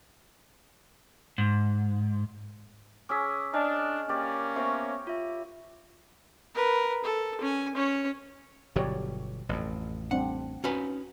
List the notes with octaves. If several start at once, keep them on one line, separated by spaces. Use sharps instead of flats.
G#2
C#4 G#4 D6 E6 B6
D4 D#5 G#5 F6
A#3 C#4 G4 D5
B3 C5 C#5 E5 G5 C#6
F4 E5
A#4 B4
A4
C#4 G#5
C#4 C#5
G1 B2 F#3 G4 C#5 D5
A1 F2
G3 C4 D4 F#5
C#4 D#4 F#4 B4